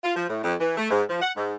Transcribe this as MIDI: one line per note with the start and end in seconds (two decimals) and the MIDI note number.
0.04 0.12 65
0.16 0.26 53
0.29 0.42 45
0.44 0.55 41
0.60 0.76 52
0.77 0.89 57
0.91 1.03 44
1.10 1.20 53
1.22 1.31 78
1.37 1.56 44